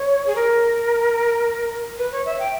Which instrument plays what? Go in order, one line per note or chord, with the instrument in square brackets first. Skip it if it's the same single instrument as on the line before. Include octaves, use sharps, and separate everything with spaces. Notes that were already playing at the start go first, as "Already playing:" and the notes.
Already playing: [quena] C#5
G#4
A#4
B4
C#5
E5
G5